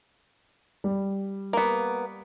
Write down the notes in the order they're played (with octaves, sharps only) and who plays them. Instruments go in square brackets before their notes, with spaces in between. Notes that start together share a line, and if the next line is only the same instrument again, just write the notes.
[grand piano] G3
[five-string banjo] A#3 B3